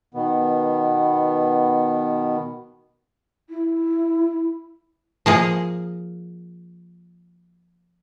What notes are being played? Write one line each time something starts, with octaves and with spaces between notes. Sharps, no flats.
B2 D#3 B3
E4
F3 A#3 G#4